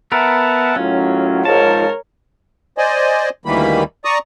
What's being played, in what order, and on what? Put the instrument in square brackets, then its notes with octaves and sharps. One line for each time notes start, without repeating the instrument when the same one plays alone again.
[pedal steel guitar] B3 A#4 [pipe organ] E5 F#5 A5
[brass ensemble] A2 D#3 F#3 [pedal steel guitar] C#4 [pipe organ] F4
[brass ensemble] G#2 [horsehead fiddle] A#4 C#5 [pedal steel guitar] A5
[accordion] C5 D5 D#5 G#5
D2 D#3 E3 G3 A#3 B5
D5 A#5 C#6 D#6